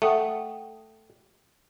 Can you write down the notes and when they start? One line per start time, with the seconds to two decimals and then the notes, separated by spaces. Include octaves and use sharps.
0.02 A3 F#5 G5 D#6